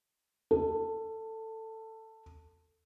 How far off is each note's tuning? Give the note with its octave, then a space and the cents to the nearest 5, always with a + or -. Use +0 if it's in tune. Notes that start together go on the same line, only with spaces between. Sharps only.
A4 +15